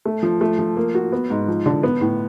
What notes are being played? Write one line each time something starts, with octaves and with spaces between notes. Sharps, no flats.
A3
F3
A3
F3
A#3
F#4
B3
G#2
F3
D3
B3
A2